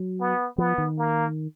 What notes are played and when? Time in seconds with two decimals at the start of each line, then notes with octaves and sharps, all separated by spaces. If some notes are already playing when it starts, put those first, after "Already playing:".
Already playing: F#3
0.20 B3
0.58 F3 B3
0.78 D#3
0.98 A#3